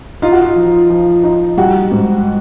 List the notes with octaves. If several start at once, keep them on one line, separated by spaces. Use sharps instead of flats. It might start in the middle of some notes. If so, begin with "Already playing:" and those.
D#4 F4
F#4
F4
F3
F3
D#4
G3 F#4
G#2